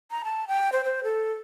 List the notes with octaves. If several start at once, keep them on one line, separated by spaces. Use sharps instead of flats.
A#5
A5
G5
C5
C5
A4